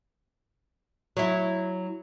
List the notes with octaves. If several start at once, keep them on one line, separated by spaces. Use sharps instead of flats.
F#3 E4